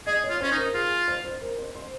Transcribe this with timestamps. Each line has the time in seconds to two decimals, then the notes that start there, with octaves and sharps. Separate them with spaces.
0.07 G#4 D#5
0.24 C#5
0.29 F4
0.41 C#4 C5
0.52 D#4
0.57 A#4
0.74 F4 G#4
1.08 C5
1.25 C5
1.41 A#4
1.59 C5
1.75 C5